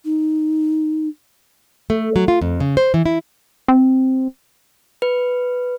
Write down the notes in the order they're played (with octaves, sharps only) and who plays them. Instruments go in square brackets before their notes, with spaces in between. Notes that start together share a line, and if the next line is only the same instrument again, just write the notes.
[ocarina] D#4
[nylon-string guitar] A3
F#3
F4
F2
C#3
C5
E3
E4
[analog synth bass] C4
[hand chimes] B4